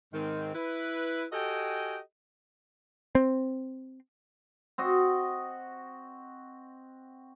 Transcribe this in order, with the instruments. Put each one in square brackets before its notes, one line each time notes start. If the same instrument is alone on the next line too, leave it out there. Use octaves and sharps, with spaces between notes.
[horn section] G#2 D#3 C4
E4 B4
F#4 G4 A4 D#5 G5 G#5
[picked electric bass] C4
[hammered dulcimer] C4 F#4 D#5